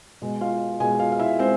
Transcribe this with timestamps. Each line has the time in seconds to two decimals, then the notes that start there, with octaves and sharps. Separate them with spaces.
0.22 B2 G#3
0.41 F4 F5
0.80 B2 G#3 G#4 G#5
0.99 F4 F5
1.12 F5
1.19 E4 E5
1.39 G#3 C4 C5